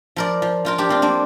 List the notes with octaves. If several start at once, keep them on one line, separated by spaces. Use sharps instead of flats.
F3 A#4 D5
F3
F3 F4 A#4
D4 G4
F3 C4 F4
A#3 D4